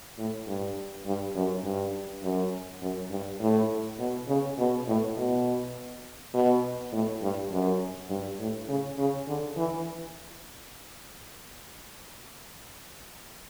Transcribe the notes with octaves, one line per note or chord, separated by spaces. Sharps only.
A2
G2
G2
F#2
G2
F#2
F#2
G2
A2
B2
C#3
B2
A2
B2
B2
A2
G2
F#2
G2
A2
C#3
C#3
D3
E3